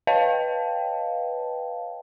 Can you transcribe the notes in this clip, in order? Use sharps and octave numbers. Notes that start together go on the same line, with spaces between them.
B4 C#5 D#5 F5 G5 A5